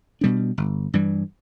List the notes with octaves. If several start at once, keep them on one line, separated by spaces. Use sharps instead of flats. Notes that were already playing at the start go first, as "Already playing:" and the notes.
B2 G3 D4
G1
G2 E3 G3